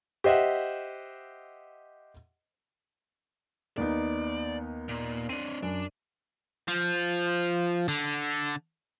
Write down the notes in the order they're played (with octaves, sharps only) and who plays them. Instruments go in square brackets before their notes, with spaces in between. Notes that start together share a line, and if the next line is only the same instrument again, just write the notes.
[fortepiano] G4 C5 D#5 E5 F#5
[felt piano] D#2 B3 D#4 [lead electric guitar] D5
[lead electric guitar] A#2
[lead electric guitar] C4 D4 [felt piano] D#7
[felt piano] F#2 [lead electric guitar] D4
[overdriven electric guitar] F3
D3